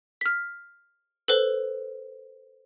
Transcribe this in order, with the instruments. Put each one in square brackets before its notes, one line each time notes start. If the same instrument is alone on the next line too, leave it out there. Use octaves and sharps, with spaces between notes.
[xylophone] F6 B6
A4 B4 C5